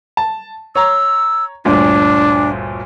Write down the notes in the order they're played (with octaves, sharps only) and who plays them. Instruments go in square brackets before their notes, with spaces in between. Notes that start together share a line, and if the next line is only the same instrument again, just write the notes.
[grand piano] A5
[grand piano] C#5 A#5 [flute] E6
[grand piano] G1 D2 A#2 [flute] D4